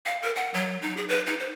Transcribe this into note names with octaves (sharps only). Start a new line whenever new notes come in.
F5
A#4
F#5
F#3
D#4
G#4
B4
D#4
C5